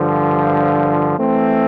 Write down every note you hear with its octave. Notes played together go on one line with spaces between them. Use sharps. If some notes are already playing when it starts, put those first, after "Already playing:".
Already playing: G2 D3 F3
E3 A3 C4